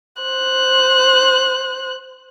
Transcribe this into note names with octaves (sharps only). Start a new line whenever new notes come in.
C5 F#6